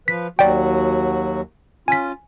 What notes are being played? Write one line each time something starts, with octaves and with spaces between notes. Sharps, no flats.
F3 B4 B6
D#2 F#3 F#4 D5 G5
C#4 F4 G#5 B6